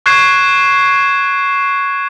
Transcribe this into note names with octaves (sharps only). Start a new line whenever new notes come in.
C#6 F#6 G#6 C7 E7